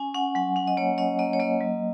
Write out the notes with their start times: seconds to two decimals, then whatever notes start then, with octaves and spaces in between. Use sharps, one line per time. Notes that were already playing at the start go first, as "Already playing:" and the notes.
Already playing: C#4 G#5
0.15 C#4 F#5
0.35 F#3 F#5
0.56 C#4 F#5
0.67 D#5
0.77 A#3 C#5
0.98 C#4 D#5
1.19 A#3 D#5
1.33 C#5
1.40 A#3 D#5
1.60 F#3